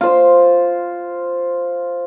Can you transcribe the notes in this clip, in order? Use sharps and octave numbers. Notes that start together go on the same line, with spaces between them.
F4 C5